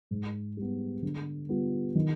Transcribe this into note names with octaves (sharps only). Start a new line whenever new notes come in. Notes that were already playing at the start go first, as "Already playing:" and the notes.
G#2
G3 B3
D3
G3 B3 F4
D#3